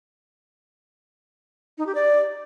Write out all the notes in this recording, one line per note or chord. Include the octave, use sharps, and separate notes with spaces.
D#4
G4
D5